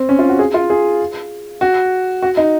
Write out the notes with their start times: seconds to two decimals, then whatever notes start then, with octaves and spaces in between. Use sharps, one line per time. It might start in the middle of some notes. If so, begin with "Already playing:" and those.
Already playing: C4
0.09 C#4
0.19 F4
0.29 F#4
0.39 G#4
0.54 F4
0.70 G#4
1.61 F#4
2.22 F#4
2.37 D#4